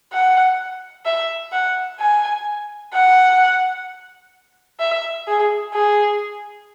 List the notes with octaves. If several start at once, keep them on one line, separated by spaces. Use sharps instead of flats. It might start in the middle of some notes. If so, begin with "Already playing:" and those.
F#5
E5
F#5
G#5
F#5
E5
G#4
G#4